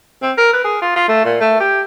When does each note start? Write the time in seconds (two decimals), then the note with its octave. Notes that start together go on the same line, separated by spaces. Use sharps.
0.22 C4
0.38 A#4
0.53 B4
0.64 G#4
0.82 F4
0.96 F4
1.08 A3
1.25 A#2
1.40 A3
1.60 G4